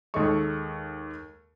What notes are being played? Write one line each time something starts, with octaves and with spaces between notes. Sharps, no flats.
D#2 D#3 G#3 A4 D#5 C#6